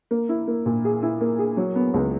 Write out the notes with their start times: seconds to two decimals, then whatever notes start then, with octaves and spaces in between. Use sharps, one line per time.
0.11 A#3
0.29 E4
0.48 A#3
0.66 A#2
0.85 G#4
1.03 E4
1.21 A#3
1.39 G#4
1.57 F#3
1.76 B3
1.94 C#2